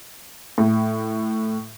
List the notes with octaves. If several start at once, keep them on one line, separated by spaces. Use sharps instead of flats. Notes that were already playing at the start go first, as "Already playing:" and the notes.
A2